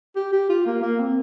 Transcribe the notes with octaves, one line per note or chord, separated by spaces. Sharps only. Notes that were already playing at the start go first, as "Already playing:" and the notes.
G4
G4
F4
A#3
A#3
C4